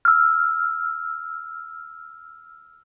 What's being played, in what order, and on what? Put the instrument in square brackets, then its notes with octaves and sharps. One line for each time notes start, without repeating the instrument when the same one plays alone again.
[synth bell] E6 F6